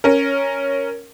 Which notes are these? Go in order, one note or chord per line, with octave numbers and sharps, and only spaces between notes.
C#4 A#4